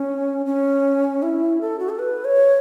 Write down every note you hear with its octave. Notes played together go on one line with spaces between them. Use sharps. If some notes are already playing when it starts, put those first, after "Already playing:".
Already playing: C#4
C#4
E4
A4
F#4
A4
B4
C#5